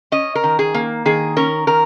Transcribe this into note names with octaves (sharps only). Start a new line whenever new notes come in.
C#4 D#5
A#4
D#3
G#4
A#3
D#3 G#4
C#4 A#4
D#3 A#4